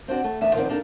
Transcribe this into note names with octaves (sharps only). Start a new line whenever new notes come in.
C4 D4 F#4
A3
E2 D3 B3 E5
D#3 F3 A3 B3 C4 D4
A#3 D4 D#4 G#4 A4